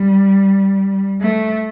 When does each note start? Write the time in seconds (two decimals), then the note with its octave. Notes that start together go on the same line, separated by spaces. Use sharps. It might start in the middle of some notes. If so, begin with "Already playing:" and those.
Already playing: G3
1.21 A3